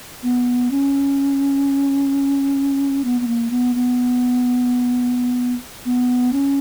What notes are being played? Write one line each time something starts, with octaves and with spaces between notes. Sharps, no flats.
B3
C#4
B3
B3
A#3
B3
B3
B3
C#4